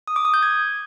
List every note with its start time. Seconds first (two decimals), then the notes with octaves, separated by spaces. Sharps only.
0.08 D#6
0.16 D6
0.25 D#6
0.34 G6
0.43 G#6